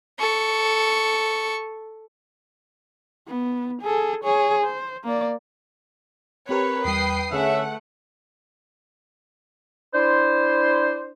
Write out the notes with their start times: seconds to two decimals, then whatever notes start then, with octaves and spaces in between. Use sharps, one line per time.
0.20 A4 C#6
3.28 B3
3.82 G#4 A4
4.24 G#4 C#5
4.64 C5
5.04 A#3 D5
6.49 C4 G4 A#4 B4 C#5
6.85 E2 G3 G5 D#6 C7
7.33 D3 A3 C#4 G#4 E5 F#5
9.94 D4 E4 C5